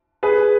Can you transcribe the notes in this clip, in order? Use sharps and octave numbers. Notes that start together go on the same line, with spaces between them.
G#4 B4